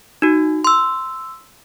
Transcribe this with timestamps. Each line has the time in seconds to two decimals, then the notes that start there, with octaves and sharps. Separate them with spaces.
0.22 D#4 F#4
0.64 C6 E6